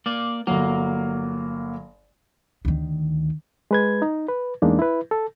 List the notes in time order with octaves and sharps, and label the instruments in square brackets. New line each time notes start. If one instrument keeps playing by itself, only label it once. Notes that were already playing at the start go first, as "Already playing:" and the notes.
[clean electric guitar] A#3 D5
[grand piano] G1 F#3 [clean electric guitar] A#3
[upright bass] D2 D#3
[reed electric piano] G#3 B4 G#6
D#4
B4
E2 G#3 A#3 D4 D#4
E4 B4
A4